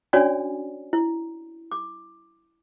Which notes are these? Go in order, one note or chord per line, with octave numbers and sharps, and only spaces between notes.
C#4 D4 F#4 C#5 D5 G#5
E4
D6